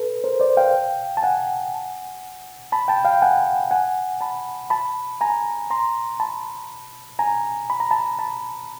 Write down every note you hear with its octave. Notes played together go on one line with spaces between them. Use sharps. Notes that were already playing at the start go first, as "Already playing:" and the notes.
Already playing: A4 B4
A#4 C5
C5 D5
F5 G5
A5
F#5 G#5
A5 B5
G5 A5
F5 G5
F#5 G#5
F#5 G#5
A5 B5
A5 B5
G#5 A#5
A#5 C6
A5 B5
G#5 A#5
B5
A#5
A5 B5
A5 B5